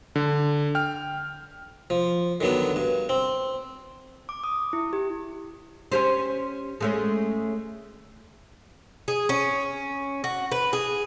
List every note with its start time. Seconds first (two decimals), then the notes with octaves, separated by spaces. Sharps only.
0.16 D3
0.75 G5 F6
1.90 F3
2.41 D3 D#3 F#3 B3 D4
2.76 G2
3.09 C4
4.29 D6
4.44 D#6
4.73 E4
4.93 G4
5.92 C#4 G4 C5
6.80 G#3 A3 C#4
9.08 G#4
9.29 C#4
10.24 F#4
10.52 B4
10.73 G#4